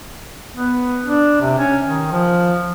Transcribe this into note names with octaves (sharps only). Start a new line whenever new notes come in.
B3
D4
C3
C#4
D#3
F3